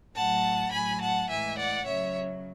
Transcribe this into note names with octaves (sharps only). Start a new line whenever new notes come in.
A2 F#3 F#5 A5
A2 F#3 G#5 B5
F#5 A5
A2 E3 G#3 E5 G#5
D5 F#5
C#3 F#3 C#5 E5